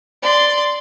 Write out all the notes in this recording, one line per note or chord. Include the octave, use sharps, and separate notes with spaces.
D5 C6